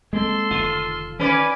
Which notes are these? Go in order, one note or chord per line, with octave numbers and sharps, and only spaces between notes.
G#3 A#3 C4 A4 C6
F1 D3 D#3 F4
D#3 C#4 B4 D5 G#5 D6